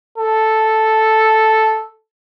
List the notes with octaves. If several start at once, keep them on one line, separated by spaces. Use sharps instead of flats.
A4